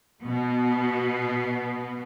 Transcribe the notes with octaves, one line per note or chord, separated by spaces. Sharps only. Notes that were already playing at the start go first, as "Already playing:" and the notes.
B2 B3